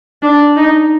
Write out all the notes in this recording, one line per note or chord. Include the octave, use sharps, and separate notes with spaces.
D4
D#4